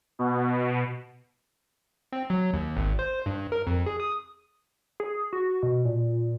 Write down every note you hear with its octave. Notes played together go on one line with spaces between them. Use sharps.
B2
C4
F#3
D#2
G#1
C5
G2
A#4
F2
G#4
D#6
G#4
F#4
B2
A#2